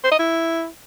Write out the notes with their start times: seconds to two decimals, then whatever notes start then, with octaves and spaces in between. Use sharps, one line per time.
0.04 C5
0.11 D#5
0.19 E4